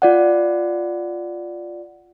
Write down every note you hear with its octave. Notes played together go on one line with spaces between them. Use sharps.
F4 D5 F#5